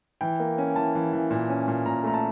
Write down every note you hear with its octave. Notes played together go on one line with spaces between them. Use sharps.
E3 G5
A#3
C#4
E3 A5
E3
E3
A#2
C#4
A#2
A#2 A#5
A3 A#5
A5